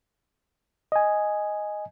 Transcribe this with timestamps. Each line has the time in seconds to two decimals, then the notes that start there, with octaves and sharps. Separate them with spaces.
0.92 D#5 G#5